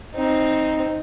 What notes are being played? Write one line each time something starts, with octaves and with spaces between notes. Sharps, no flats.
C4 D#4